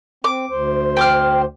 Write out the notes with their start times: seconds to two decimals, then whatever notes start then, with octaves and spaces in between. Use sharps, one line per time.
0.24 C4 D6
0.50 D2 C5
0.97 G5 D6 F6